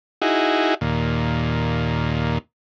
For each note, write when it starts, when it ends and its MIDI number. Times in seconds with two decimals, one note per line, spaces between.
0.22 0.74 63
0.22 0.74 64
0.22 0.74 66
0.22 0.74 68
0.81 2.38 39
0.81 2.38 46